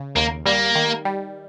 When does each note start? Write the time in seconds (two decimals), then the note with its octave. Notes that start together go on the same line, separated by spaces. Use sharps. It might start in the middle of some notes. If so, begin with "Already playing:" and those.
Already playing: C#3
0.16 D#2 A#3
0.45 G3 A#3
0.75 D#3
1.05 G3